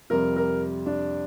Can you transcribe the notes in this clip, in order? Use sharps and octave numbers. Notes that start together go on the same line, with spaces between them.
F2 C3 G3 A#4
A#4
D4